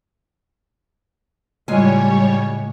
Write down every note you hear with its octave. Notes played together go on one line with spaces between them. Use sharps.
A2 C#3 G3 G#3 F4 C#5 G#5